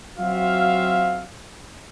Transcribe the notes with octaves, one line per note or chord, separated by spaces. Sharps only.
F#3 C4 F4 F#4 E5 F5